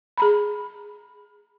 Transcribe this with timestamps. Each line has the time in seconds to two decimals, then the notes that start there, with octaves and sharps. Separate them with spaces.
0.18 G#4 A#5 B5